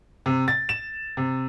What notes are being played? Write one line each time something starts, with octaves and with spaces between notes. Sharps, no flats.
C3
A6
E7
C3